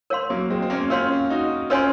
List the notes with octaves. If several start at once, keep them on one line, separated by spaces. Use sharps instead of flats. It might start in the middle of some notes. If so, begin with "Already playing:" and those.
A#4 C#5 F5 C6
F#3 A#3
G#3 C4
C4
A#3 C#4
C#4 F4 A#4 C#5 F5 C6
D#4 F#4
C#4 F4 A#4 C#5 G#5 C6